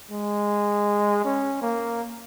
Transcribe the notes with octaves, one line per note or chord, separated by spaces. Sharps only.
G#3
C#4
A#3